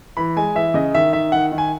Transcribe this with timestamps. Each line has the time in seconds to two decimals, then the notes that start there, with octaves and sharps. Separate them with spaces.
0.17 E3 B5
0.37 G#3 G#5
0.55 E3 E5
0.74 C#3 D#5
0.95 D#3 E5
1.13 D#3 E5
1.32 D#3 F#5
1.52 D#3
1.58 G#5